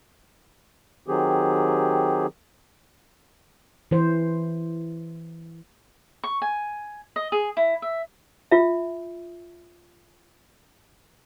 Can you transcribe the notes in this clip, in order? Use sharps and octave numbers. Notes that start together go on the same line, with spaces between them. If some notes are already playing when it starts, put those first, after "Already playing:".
D#3 F#3 C4 G4 G#4
E3 C5
C#6
G#5
D#5
G#4
E4
E5
F4 E5